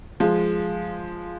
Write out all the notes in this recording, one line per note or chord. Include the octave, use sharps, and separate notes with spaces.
F3 G#3